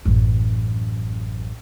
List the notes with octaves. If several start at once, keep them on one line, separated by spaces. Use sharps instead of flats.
A1 F#2